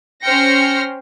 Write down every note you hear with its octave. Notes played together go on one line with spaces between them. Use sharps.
C#4 C5 G5 F6 A#6 C#7